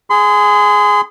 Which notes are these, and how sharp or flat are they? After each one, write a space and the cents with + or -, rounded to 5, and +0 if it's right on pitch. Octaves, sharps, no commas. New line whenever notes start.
G#4 +0 C6 -35